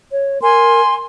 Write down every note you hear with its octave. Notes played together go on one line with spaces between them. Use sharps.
C#5
A#4 G#5 C6